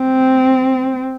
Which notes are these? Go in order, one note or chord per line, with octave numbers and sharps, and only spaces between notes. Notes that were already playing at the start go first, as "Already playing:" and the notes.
Already playing: C4